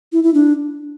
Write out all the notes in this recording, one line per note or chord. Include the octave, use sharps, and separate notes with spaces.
E4
E4
D4